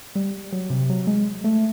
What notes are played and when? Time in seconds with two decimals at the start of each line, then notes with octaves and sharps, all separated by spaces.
0.15 G3
0.52 F#3
0.70 C3
0.89 F#3
1.07 G#3
1.44 A3